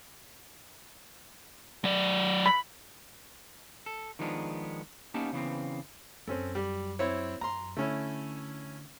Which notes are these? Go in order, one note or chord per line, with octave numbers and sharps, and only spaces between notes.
F#3 D5
B5
A4
D#3 F3 G#3 B3 D4
A#3 B3 C#4 D#4 G4 A5
C#3 E3 B3 C4
F#2 C4 C#4 A4
G3
C4 E4 C#5
F#2 A#5 C6
D3 A3 C#4 E4